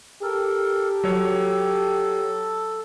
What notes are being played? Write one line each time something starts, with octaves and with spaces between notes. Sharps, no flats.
G4 A4 A#4
F#3 A4 C#5